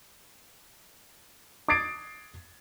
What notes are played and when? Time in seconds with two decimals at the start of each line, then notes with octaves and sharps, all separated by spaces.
1.68 D6 D#6 G#6 A6 C7 D7